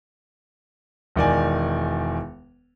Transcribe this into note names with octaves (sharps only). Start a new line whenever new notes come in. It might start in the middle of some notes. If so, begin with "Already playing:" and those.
E1 D#3 D5 G#5